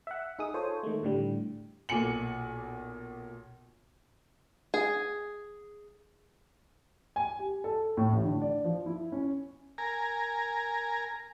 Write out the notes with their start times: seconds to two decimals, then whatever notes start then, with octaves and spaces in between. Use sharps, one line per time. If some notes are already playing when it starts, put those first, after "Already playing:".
0.07 E5 F#5
0.39 D#4 G#4 D#6
0.54 F4 A4 C5 C#5
0.83 D#3 G#3 A3
1.03 A2 D3 G3
1.89 B1 A#2 G#5 C#7 F#7
4.74 G#4
7.16 G#5
7.39 G4
7.64 A4
7.97 A2
8.13 A1
8.25 D3
8.42 D5
8.64 F3
8.86 E4
9.12 C#4
9.78 A#4 G#5 A#5